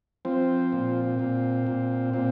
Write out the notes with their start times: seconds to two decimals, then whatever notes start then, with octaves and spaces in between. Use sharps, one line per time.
0.25 F3 C4
0.73 A#2
1.19 A#2
1.67 A#2
2.14 A#2 C4